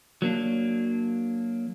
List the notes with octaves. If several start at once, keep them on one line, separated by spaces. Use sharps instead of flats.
F#3 A#3 D4